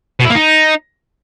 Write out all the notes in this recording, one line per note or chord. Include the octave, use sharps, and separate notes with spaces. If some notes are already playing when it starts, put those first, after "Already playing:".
B2
E4
A#3
D#4